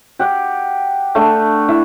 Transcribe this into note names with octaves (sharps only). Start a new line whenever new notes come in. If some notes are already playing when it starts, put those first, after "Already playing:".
G4 F#5
A3 D4
E4